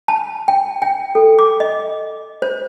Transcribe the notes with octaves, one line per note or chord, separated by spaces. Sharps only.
A5
G5
G5
A4
D6
D#5
C5